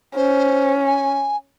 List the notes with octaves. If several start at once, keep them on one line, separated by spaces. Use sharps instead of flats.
C#4 C5
G#5